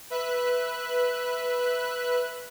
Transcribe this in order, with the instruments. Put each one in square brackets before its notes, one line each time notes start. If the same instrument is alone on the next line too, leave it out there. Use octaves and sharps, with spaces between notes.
[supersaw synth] B4 E5 F#6